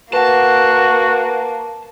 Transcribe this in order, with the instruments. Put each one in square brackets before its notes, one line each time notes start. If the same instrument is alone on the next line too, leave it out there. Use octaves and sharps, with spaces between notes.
[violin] A#3 [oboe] F#4 [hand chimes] B4 F#5 [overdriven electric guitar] A5